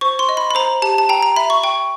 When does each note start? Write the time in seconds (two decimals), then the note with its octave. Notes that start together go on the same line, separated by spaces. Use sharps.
0.01 C5 C#6
0.19 C6
0.29 D#5
0.37 B5
0.51 B5
0.55 C5 A#5
0.82 G4 A5
0.98 A5
1.09 G5 A#5
1.23 A#5
1.36 E5 B5
1.50 C#6
1.63 G5 C#6